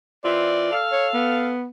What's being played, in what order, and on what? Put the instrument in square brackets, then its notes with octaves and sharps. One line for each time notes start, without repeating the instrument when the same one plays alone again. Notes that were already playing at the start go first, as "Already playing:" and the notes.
[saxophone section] E3 C4 F4 [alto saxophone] D5
[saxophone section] A4 F5
[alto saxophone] C#5
B3